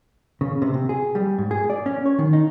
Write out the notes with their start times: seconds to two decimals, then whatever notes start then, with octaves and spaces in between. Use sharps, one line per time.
0.41 C#3
0.62 C3
0.74 C3
0.89 G#4
1.15 G3
1.38 G#2
1.51 G#4
1.70 D5
1.86 C#4
2.06 C#5
2.19 D#3
2.33 D#4